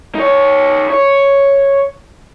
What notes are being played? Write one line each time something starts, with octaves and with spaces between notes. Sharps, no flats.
D#4 C#5
C#5